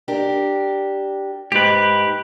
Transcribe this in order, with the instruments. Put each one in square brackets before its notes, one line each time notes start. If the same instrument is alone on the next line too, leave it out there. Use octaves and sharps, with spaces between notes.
[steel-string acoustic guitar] D4 G4 A#4
[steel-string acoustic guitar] G#2 [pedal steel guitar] G4 B4